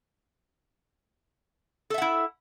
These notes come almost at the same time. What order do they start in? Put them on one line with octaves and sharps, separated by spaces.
A4 E5 F#5 E4